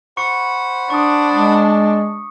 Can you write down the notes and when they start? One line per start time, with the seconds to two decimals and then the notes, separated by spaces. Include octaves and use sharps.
0.17 C5 F#5 B5 C#6 C#7
0.90 D4 C#6 D#6
1.31 G#3 D#6